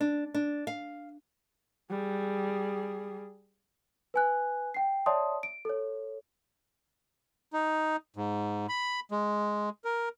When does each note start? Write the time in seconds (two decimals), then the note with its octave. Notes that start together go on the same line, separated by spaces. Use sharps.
0.01 D4
0.34 D4
0.67 F5
1.90 G3 G#4
4.14 B4 G#5 F#6
4.74 G5 C7
5.06 C#5 D5 E5 A5 C6 D#6
5.43 D7
5.65 A4 C#5
7.53 D#4
8.16 G#2
8.69 B5
9.11 G#3
9.85 A#4